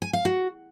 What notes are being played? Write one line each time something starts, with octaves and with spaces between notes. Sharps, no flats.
G#5
F5
F#4